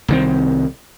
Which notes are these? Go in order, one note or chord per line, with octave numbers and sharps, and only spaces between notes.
C2 D#3 C4